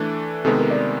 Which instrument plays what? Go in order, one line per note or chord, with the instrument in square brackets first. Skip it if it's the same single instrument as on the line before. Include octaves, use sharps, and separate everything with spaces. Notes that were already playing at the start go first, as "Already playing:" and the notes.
Already playing: [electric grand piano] E3 A3 D4 [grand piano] A4
[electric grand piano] C3 D#3 G#3 B3 [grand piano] A4
[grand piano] A#4
D5